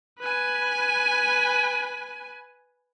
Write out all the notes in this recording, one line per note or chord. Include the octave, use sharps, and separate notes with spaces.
B4 G#5